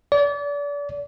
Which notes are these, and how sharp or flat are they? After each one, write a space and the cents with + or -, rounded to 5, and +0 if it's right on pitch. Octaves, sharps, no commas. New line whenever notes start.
D5 -35